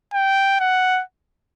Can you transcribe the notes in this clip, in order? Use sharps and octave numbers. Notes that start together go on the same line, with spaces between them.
G5
F#5